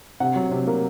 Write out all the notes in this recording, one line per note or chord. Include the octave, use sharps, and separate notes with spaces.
C3 F#5
F#3
C3
A#3